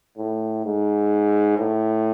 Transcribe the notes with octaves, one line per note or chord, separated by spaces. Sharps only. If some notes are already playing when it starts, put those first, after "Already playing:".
A2
G#2
A2